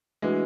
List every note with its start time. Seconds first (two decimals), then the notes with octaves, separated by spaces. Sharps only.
0.22 E3 G#3 A3 D4 F#4 B4